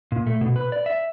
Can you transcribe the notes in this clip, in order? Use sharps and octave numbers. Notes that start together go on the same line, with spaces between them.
A#2
A3
B2
B4
D5
E5